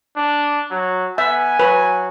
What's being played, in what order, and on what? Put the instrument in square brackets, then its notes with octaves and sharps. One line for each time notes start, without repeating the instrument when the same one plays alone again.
[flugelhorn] D4
F#3
[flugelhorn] B3 [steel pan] E5 [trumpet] G#5
[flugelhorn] F#3 [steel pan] B4